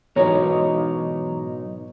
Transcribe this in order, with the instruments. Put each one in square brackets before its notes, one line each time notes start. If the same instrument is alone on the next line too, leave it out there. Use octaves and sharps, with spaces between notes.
[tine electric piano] G#2 E3 A#5 [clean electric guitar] B2 F#3 D#4 [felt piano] C#5